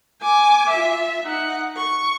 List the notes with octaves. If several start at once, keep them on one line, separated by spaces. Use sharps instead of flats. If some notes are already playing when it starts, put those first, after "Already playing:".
G#5 D6
F4 E5
D#4 F#5
C#6